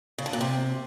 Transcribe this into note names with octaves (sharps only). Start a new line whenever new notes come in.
C#3
D3
A#2
C3